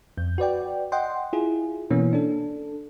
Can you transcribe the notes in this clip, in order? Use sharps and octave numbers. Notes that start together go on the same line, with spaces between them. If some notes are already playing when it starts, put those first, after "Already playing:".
F2 G6
F#4 B4 D5 G5
D#5 F#5 G5 C6
E4 F4 G#4
B2 E3 A#3 B3 C#4
D4 A4